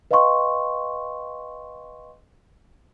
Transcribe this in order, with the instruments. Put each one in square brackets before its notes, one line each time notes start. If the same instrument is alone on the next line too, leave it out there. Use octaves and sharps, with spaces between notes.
[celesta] B4 D#5 F5 G5 C6 C#6